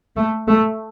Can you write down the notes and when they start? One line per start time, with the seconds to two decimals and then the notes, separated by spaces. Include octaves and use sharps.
0.16 A3
0.47 A3